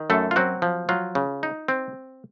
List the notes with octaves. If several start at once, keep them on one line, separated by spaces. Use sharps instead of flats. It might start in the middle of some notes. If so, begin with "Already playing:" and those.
Already playing: D#3
F#2 A3 A4
F4
F#3 C4 F#4
F3
F#3 F4
C#3
D#4
C4